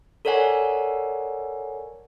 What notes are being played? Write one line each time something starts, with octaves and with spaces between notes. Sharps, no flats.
A4 A#4 C#5 D5 F#5 G#5